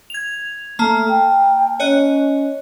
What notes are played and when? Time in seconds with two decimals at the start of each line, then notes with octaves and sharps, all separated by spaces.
0.10 G#6 F7
0.79 A3 A#3 A5 A#5
1.09 G5
1.80 C#4 C#5 D#5 F#6